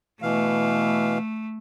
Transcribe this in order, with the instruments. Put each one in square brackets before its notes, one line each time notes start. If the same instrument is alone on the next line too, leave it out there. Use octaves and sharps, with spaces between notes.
[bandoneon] B2 E3 F5 [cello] A3